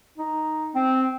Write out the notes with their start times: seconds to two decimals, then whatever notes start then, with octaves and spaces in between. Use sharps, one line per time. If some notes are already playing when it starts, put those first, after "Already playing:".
0.18 D#4
0.75 C4